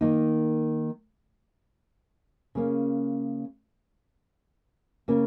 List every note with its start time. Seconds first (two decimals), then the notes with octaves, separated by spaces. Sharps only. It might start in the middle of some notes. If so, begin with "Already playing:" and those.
0.01 D#3 A#3 D#4
2.55 C#3 A#3 C#4
5.08 C#3 A#3 C#4